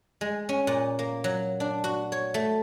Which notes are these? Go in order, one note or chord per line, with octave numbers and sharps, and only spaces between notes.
G#3
C#4
A#2
A#3
F#3
D4
F#4
C#5
A3